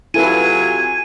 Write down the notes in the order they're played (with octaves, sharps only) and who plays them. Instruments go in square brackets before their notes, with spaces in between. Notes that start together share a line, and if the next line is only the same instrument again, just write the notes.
[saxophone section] C3 F#3 F4 [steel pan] E4 A4 B4 [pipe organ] G#5 [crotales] D#7